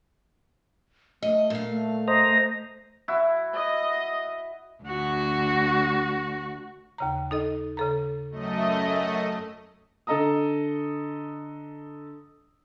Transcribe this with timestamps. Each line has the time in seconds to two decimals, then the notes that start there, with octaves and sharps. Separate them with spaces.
1.22 A3 D#5
1.50 A#2 F5
1.69 A3
2.08 C5 D#5 A#5
3.08 E4 F#4
3.55 D#5
4.83 D2 F#4
6.98 D#2 C#3 A#5
7.31 D#4 A4 D#5
7.77 C#3 A4 A#5
8.30 F#2 A3 D#5
10.07 D3 A4 D#5 A#5 D#6